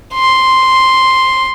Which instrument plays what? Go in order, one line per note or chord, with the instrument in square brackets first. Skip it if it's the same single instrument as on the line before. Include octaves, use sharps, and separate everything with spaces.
[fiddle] C6